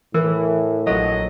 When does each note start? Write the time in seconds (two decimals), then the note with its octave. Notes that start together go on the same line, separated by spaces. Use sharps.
0.14 A2 E3 A#4
0.87 A#1 F#3 A4 D#5 F5